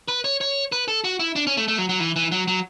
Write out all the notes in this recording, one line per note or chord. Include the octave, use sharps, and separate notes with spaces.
B4
C#5
C#5
B4
A4
F#4
E4
D4
C#4
A3
A3
F#3
F#3
E3
E3
F#3
F#3